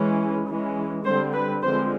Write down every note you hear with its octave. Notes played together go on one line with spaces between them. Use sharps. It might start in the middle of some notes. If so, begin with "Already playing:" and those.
Already playing: E3 G#3 C#4
E3 G#3 C#4
D3 G3 C4 C5
B4
D3 F3 G#3 C4 C5